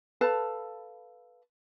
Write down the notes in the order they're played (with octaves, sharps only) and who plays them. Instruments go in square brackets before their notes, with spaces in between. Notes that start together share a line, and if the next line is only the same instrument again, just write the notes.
[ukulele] A4 B4 F5 A5